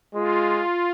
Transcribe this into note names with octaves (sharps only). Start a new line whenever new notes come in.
G#3 F4